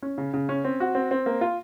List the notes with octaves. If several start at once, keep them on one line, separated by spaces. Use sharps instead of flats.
C#4
C#3
C#3
C#4
C4
F#4
C4
C4
A#3
F4